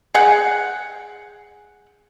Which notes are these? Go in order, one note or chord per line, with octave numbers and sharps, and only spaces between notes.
G#4 F#5 G5